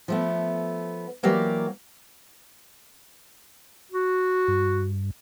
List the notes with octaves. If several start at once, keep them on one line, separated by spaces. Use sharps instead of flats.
F3 A3 B3
E3 F#3 A#3 G4 D5
F#4
G2